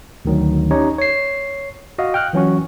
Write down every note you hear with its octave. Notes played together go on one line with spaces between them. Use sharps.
D2 D#3 F#3
C#4 D#4 G4 C#5
C#5 C7
F#4 D#5 F5
G5 F6 F#6
E3 F#3 C#4 F#4